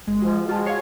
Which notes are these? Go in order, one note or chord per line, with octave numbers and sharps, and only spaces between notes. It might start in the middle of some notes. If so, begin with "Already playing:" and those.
G1 G#3
F3 F#4
G#3 F4 F#4 A5
C#5 F5 G#6 C7